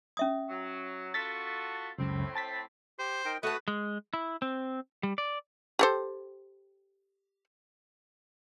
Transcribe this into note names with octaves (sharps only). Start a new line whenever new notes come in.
C#4 E5 D#6
F#3
F4 F#4 A4 A6 B6
C#2 F#2 A2 C#3 C4
A5 A6 B6
G4 C5
D#4 A#4 G5
A3 F#4 B4 A5 D#6
G#3
E4
C4
G3
D5
G4 A4 C5